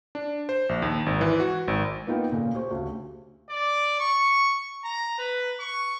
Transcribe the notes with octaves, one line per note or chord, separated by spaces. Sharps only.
D4
C5
A#1
D#2
G#1
E3
F#4
G#1
A#3 B3 D#4 F4 A#4 G5
A#2 C#3 A3 A#3
G4 C5 C#6
D2 C#3
D5
C#6
A#5
B4
C#6